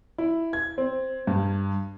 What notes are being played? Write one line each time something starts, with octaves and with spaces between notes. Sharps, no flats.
E4
G#6
C4
G2